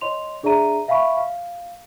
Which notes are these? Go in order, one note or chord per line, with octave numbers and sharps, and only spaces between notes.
C#5 D#5 C6 F7
D4 G#4 D5 E5 A#5 D#7
E5 F5 G#5 B5 C#6
F5